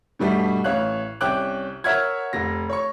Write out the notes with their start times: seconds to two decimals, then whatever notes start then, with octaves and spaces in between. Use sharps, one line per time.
0.19 G2 B2 G3 A3
0.64 A1 C#5 F5 F#6
1.21 C2 C#4 G5 D6 F#6
1.84 A#4 C#5 E5 F#5 F6 G#6
2.33 F1 A#6
2.70 C#5 C#6